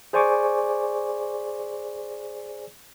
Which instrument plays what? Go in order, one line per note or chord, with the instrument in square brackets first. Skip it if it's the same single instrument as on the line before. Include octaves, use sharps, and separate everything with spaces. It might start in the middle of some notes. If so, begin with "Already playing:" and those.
[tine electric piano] G#4 C5 D5 G#5 C#6 D6